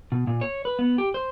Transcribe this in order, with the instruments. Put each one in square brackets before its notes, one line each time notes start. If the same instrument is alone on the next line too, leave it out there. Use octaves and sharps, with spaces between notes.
[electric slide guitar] B2
A#2
C#5
B4
B3
G4
C5